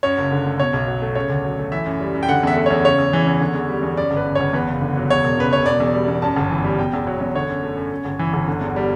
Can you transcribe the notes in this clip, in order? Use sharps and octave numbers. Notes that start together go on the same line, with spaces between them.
F#2 C#5
F#1
D3
A3
B2 C#5
B1
F#3
A3
C#3 C#5
D2
F#3
A3
E3 E5
F#2
G3
F#2
G5
D3 F#5
E2 E5
A3
E2 C#5
C#3 C#5
E2
E3
E2
D3
E2
G3
E2
F#2 D5
G1
B4
C#3
G1 C#5
E2 B4
F#1
D3
F#3
E2 C#5
E1
C#3 B4
E1 C#5
B2 D5
E2
G3
E2
F#2 A5
G1
E3
G3
B2 G5
E2
F#3
E2
D3 C#5
F#2
A3
F#2
F#2
G1
E3
G1
D3
E2
G3